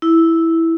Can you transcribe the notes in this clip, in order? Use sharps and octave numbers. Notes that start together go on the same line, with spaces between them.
E4